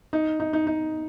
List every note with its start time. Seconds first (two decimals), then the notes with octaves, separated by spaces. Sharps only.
0.13 D#4
0.40 D#4
0.53 D#4
0.67 D#4